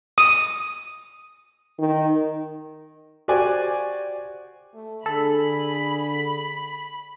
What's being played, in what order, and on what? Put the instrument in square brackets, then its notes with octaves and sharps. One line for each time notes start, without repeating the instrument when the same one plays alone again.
[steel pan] D#6
[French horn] D#3
[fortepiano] F#4 G4 C5 D5 G#5 D6
[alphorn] A3
[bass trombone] D3 [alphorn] G#4 [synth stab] A4 [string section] B5